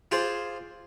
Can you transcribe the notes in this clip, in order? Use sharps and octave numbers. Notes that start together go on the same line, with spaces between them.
F4 G#4 C5 D5